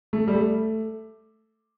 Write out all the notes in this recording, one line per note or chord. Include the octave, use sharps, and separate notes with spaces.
A3
G3
A3